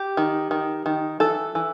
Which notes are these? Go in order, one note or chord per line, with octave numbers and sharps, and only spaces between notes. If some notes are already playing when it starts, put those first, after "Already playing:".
Already playing: G4
D#3
D#3
D#3
E3 A4
E3